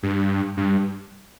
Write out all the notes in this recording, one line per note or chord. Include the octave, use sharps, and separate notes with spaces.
G2
G2